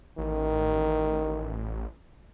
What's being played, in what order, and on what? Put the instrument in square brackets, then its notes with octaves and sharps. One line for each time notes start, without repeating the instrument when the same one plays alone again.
[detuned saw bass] A1 [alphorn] D#3